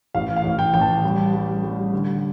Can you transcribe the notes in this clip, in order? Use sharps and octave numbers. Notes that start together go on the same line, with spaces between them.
A1 F5
F5
A1
G5
A1 G5
A5
G3
G3
G3
D3